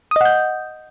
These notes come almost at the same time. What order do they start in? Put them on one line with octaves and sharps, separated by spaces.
D#6 D#5 F#5 G6